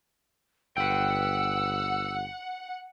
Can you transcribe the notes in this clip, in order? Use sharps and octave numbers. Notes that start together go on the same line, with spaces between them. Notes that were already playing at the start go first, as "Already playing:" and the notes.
G1 B4 F#5 G5 E6